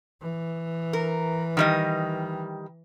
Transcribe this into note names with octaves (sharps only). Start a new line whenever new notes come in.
E3
A#4
D#3 G3 D#5